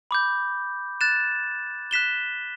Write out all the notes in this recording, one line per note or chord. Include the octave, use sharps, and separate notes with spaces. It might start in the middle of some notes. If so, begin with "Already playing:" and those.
B5 D6 G6
F#6 A6 E7
F#6 B6 E7 G7